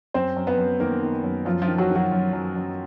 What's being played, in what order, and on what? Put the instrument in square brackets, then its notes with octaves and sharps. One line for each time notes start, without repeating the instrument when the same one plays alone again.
[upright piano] F#2 C4 C5
F#2
B3 B4
F#2
D#3 A#3 A#4
D#3
F#2
F#2 F3 F4
F3 F4
D#3
F#3 F#4
D#3
F#3 F#4
F#2
F#2
F#2